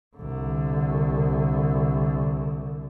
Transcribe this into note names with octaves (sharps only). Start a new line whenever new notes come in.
C2 D3